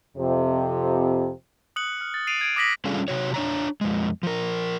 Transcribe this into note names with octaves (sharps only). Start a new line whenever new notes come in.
F2 C3
D#6 F#6 C#7 F#7
F6
A6
C7 D7 D#7 F7
G#6 D7 D#7
D6 D#6 A#6 B6 F#7
G3 C#4 D4 F4 G#4 A4
C3 F#4 C#5
D4 C#5 A#5
F2 G#3
F3 A#4